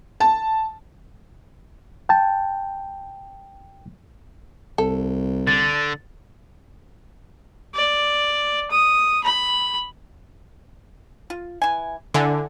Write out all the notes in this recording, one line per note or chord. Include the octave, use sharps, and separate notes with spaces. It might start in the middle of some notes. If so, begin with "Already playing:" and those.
A5
G5 A5
C2 A4
D3 A6
D5
D#6
B5
F4
E3 G#5
D3 E4 G#5